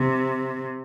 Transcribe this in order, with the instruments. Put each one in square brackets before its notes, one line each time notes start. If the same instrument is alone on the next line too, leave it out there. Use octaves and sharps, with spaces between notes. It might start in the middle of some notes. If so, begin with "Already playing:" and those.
Already playing: [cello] C3